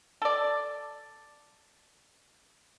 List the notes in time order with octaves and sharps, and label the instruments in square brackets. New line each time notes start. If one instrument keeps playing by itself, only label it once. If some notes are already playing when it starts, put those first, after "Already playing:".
[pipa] A4 D5